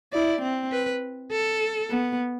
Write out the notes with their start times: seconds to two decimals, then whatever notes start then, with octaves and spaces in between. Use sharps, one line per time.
0.13 E4 D5
0.42 C4
0.72 B4
1.31 A4
1.90 B3